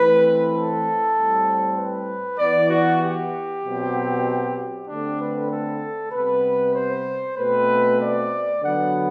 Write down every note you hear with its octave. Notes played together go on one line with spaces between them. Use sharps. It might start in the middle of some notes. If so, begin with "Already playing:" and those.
Already playing: E3 A3 C4 B4
A4
A2 G3 C4
B4
E3 B3 D5
F#4
G4
B2 F#3 C4
D3 A3 C4 D4
B4
A4
C3 G3 B3 B4
C5
B2 A3 C4 B4
D5
D3 F#3 B3 F#5